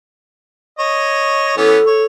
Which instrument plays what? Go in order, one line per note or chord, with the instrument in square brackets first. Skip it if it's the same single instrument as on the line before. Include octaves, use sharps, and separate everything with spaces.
[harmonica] C#5 D#5
[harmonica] E3 B3 C#4 [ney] A4
[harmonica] C#5